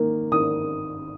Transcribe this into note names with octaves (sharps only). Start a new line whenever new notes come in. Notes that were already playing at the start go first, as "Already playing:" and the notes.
Already playing: D#3 A#3
D#3 D#6